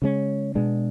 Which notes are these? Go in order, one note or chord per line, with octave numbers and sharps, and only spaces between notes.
C#3 G#3 C#4
B2 G#3 B3 D4